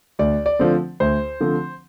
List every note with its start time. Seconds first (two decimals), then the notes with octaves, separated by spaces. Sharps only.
0.19 D2 D5
0.46 D5
0.59 D3 F3 A3 C4
1.00 D2 C5
1.41 D3 F3 A3 C4